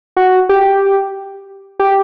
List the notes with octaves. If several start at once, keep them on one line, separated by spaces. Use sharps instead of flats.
F#4
G4
G4